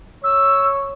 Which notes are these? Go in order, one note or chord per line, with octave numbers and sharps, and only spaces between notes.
C#5 E6